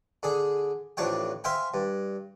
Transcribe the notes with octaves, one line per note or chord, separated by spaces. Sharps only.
D3 G#4
A1 F2 D4 C#5 G5
C5 E5 F5 G5 G#5
G2